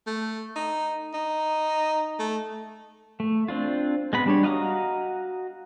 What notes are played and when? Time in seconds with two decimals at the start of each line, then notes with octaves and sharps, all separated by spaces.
0.07 A3
0.56 D#4
1.14 D#4
2.19 A3
3.20 A3
3.48 C4 D4 F4
4.13 G#3 B3 B5
4.26 G3 D4 C#5
4.43 F#4 D#5 F5 A#5 D#6